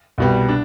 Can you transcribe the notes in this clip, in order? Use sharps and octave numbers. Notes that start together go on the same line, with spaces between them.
C2 B2 G3
D4